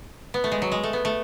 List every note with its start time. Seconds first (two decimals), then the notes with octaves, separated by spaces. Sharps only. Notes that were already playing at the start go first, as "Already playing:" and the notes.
0.34 B3
0.44 A3
0.52 G#3
0.62 F#3
0.72 G#3
0.83 A3
0.93 B3
1.05 A3